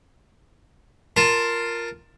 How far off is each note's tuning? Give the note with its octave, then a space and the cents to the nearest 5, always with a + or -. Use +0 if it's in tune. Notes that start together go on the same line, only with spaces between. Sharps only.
F4 +0 A#4 +0 A5 +15